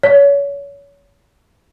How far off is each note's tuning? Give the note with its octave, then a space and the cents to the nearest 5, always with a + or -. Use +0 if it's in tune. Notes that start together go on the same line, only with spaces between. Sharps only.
C#5 +30